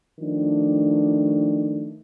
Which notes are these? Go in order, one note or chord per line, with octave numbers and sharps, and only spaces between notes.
D#3 F3 A3 D4